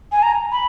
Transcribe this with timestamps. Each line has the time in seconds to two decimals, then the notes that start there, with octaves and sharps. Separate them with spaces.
0.12 G#5
0.23 A#5
0.52 B5